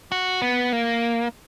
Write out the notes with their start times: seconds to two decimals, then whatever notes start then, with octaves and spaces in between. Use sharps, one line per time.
0.12 F#4
0.42 B3
0.73 A#3